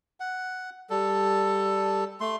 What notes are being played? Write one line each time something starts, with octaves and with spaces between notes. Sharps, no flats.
F#5
G3 A4
A3 C6